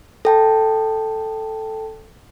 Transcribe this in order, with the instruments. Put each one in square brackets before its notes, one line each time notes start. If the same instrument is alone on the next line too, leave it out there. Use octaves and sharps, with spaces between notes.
[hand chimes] A4 G5 A5